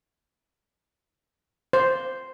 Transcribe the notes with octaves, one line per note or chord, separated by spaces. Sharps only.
C5